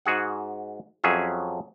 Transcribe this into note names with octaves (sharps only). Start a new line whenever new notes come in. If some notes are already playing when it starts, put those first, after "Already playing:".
G#2 F#4 G#4 F#5
F2 F#3 C#4 G#4 E5